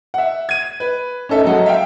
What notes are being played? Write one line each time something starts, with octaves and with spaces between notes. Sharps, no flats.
E5 F#5
G#6 D#7
B4
C#4 D#4 A4 E5
F#3 G#3 A4 D#5 F#5
E5 F5 G5